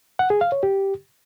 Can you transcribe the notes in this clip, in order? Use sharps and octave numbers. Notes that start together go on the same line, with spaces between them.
F#5
G#4
F5
C#5
G4